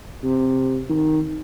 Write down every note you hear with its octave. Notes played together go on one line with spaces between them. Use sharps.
C3
D#3